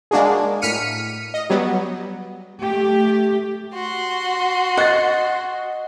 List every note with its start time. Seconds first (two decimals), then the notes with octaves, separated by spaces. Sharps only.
0.11 G#3 A#3 D4 F#4 G#4
0.62 A2 F6 B6 C#7 D#7
1.34 D#5
1.50 F#3 G3 B3
2.63 A3 G4
3.74 F#4 C6
4.77 D#5 F#5 A6